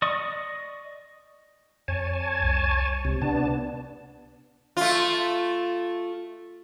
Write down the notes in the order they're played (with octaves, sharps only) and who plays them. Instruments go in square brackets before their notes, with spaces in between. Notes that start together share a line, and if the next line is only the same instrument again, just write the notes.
[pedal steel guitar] D5 D#5 C#6 D#6
[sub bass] F2 [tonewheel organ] C#5 G#5 A5
[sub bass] C2
[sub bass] C#2 [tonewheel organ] C3
[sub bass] C3 [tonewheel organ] B3 D4 A5
[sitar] A3 F4